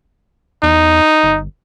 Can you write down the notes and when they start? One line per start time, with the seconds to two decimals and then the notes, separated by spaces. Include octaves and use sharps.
0.63 E2 D#4
1.23 G1